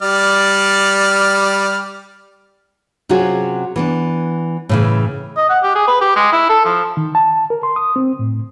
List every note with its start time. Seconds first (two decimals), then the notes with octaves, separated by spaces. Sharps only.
0.02 G3 D5 F6
3.09 C3 F#3 C#4 F4 F#4 G#4
3.76 E3 B3 D4
4.69 A2 C#3 E3
5.36 D#5
5.49 F#5
5.63 G4
5.75 G#4
5.88 B4
6.01 G4
6.16 G#3
6.33 E4
6.49 A4
6.65 F3
6.97 D#3
7.15 A5
7.50 A#4
7.63 C6
7.76 D#6
7.96 C4
8.19 A2